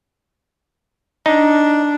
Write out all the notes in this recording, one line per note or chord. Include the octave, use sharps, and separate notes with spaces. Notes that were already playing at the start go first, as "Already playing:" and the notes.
D4 D#4